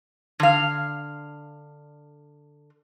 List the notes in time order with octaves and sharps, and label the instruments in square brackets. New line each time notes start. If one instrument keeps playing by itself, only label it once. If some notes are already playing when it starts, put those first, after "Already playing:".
[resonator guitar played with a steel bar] D3 F5